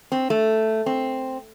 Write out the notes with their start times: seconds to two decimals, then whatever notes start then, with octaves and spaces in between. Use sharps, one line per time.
0.12 C4
0.30 A3
0.86 C4